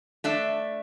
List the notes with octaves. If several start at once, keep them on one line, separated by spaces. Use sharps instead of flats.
A3 D4 E5